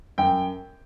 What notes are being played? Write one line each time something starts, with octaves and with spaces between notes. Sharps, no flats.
F#2 G5